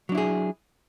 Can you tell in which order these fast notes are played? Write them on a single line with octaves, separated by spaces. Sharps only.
F#3 D4 E4 G#4